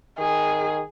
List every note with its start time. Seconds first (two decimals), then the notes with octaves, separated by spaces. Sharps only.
0.19 D#3 G#4